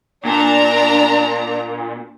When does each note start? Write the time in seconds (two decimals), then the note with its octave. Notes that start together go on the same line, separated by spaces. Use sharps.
0.25 A#2 D4 A#5